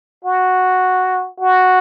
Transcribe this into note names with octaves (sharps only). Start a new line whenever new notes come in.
F#4
F#4